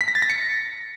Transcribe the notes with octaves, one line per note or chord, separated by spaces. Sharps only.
B6
A#6
A6
A#6
C#7